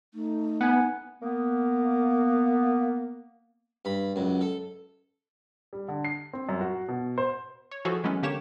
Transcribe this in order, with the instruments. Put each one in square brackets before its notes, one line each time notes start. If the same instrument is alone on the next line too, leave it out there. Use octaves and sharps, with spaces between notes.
[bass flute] A3 [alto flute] D#4
[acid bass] B3 [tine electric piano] F#5 G#5
[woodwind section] A#3 B3
[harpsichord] G2 B5
C#2 F#2
A4
[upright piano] G3
D3
C7
C4
F#2
F#4
B2
C5
[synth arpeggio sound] C#5
E3 F3 F#4 G#4 A4 C#5
E3 F#3 G#3 B3 C#4
D3 A#3 G4 C#5 E7